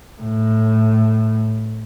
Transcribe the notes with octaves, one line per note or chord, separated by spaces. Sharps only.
A2